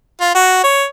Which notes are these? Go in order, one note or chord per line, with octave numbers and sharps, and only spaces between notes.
F4
F#4
C#5